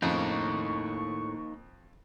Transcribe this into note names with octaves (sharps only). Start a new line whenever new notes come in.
F2 A2 C#3 A#3 D#4 C#6